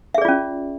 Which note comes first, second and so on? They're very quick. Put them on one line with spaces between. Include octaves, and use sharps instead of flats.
E5 G#4 D5 F4 C#4